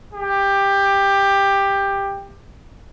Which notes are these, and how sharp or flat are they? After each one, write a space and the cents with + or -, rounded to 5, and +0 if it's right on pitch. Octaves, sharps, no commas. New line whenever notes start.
G4 +15